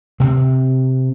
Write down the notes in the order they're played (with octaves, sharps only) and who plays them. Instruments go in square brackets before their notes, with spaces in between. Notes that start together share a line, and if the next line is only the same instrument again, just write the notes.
[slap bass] C3 C4